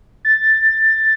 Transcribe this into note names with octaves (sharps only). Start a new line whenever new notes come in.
A6